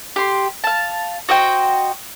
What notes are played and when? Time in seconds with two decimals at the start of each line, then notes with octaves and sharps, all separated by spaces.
0.16 G4 C6
0.64 F5 A5
1.29 F#4 C5 D#5 G5